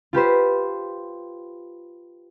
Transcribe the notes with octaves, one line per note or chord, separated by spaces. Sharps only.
F4 G4 B4 C5